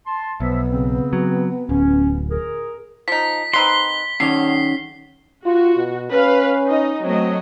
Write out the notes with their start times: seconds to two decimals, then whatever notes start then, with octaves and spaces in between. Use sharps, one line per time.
0.06 A5 C6
0.40 B1 F3 B3 E5
0.70 C#3 C4
1.13 F#3
1.69 D1 C#4
2.30 G#4 A#4
3.08 F3 D#4 B6
3.53 C4 D#4 B4 C6 B6 G7
4.20 D3 D#3 C#4 C#5 C7
5.46 F4 F#4
5.77 B2
6.11 C#4 B4 F5
6.66 D#4 D#5
7.04 F#3 A3 C4 D#5